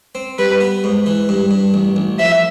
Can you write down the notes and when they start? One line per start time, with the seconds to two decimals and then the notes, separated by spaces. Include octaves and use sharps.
0.15 C4
0.39 G3 B4
0.61 B3
0.84 G#2
1.06 E3
1.29 G2
1.51 G2
1.74 A1
1.96 A1
2.19 F3 E5